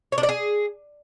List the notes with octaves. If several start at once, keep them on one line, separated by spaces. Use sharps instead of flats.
C#5
D4
D5
G#4